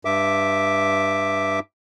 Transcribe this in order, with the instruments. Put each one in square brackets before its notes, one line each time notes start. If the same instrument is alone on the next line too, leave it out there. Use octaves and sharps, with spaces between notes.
[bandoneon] G2 E5 D6